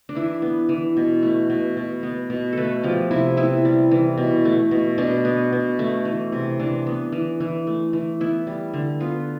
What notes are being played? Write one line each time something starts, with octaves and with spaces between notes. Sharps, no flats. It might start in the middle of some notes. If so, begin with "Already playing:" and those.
D4
E3 E4
B3
E3
B2
A3
B2
B2
B3
B2
A3 A4 B4
F3 G4
C3 E4
B3 E4
G3
E3
B2
A3
B2
B2 D4
B3
B2
A3
E3
C3
E3 D4
B3
E3
E3
A3
E3
B3 E4
G3
D3
B3 F4